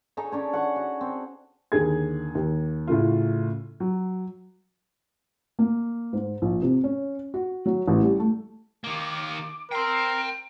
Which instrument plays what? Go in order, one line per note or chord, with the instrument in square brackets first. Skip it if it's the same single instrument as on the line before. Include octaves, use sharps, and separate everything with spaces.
[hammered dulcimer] D#4 G#4 A4 C#5
C#4 D4 C#5
F#5 C#6
F#4
C4
[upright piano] D#2 D3 G#4 G#6
D#2
A2 C#3 A3 F4
F#3
[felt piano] A#3
G#2
A#1
C3
C#4
F#4
F#3
A1
G3
A3
[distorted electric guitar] D#3 A#3 [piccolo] D6
[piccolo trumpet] A#4 [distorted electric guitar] G5 C6 [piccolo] C7
[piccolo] D7